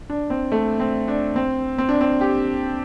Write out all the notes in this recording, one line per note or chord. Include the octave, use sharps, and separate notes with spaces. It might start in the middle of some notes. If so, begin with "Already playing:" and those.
D4
C4
A3
C4
D4
C4
C4
D4
C4
G4